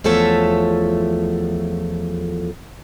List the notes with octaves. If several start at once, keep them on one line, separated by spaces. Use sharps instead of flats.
E2 F3 A3 A4 C#5 E5